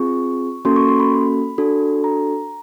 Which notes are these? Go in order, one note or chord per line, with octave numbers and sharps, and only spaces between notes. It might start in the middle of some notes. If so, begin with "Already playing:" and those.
Already playing: C4 F4 G#4 C#6
A#3 C#4 F#4 A4 C6
C#6
C6
B5
D4 F#4 A4
A#5